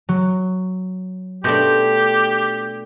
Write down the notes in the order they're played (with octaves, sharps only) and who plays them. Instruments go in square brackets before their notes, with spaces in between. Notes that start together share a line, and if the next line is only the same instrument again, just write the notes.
[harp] F#3
[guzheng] B2 A3 D4 [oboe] G4 [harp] C6 G6 A#6